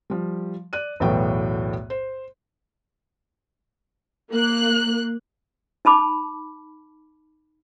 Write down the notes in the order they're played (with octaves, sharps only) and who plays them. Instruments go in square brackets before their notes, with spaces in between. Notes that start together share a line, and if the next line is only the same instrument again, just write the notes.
[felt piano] F3 G3
D5 F#6 D#7
B1 E2 A2 B3 F#4 G5
C5
[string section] A#3 F#6
[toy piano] D#4 A5 B5 D6